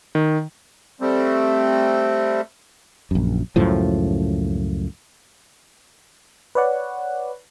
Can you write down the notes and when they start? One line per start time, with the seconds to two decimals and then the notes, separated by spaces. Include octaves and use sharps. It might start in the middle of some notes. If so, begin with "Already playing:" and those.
0.15 D#3
1.01 G3 A3 C4
3.11 A#1 F#2
3.56 C#2 F#2 A2 F3
6.55 B4 C#5 D5 F#5